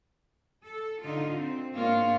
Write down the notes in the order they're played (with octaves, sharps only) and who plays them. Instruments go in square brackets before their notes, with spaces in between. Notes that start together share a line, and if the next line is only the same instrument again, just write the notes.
[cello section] A4
D3 D#4 F4
C4
[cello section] G#2 D4 C#5 [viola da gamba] A#3 F4